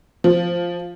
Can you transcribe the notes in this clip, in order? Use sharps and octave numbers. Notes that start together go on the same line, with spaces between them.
F3